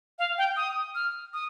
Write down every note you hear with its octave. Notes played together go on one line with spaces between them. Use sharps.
F5
G5
D#6
F6
D#6